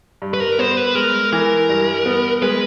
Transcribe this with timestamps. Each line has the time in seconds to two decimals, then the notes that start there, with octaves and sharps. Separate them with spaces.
0.22 G2
0.34 B4
0.40 A#4
0.59 B3 C5
0.77 B4
0.95 G#3 A#4
1.32 E3 A#4
1.69 G2
2.06 B3
2.42 G#3 B4